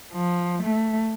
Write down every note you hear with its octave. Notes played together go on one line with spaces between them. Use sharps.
F3
A3